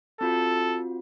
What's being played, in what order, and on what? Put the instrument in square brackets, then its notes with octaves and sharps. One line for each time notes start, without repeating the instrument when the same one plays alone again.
[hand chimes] C4 F4 F#4 [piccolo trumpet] A4